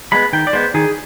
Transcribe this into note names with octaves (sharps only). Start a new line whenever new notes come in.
G#3 B3 B5
D#3 G5
D5
G#3 B3 C5
D#3 G#4